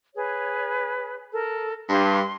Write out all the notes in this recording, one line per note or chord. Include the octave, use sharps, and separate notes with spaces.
G#4 B4 C#5
A4 A#4
G2 C6